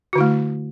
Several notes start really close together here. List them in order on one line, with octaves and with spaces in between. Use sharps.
F#4 D3 E4 A3